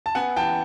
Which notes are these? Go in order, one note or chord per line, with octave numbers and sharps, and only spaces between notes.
A5
B3 F#5 G#5
E3 G5 A5